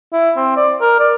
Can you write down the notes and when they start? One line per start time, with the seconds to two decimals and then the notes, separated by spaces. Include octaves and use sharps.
0.13 E4
0.37 C4
0.57 D5
0.82 A#4
1.00 D5